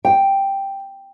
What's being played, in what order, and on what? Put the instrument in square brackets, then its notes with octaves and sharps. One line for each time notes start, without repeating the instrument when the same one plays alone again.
[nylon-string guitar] G5